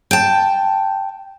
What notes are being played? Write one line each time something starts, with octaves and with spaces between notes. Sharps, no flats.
G5 A5